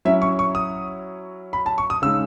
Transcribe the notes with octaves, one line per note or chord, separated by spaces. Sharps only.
F#3 C#4 E4 E5
C#6
C#6
D#6
B5
A5
C#6
D#6
C#3 G#3 D#4 E6